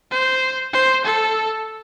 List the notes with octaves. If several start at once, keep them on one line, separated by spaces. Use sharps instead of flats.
C5
C5
A4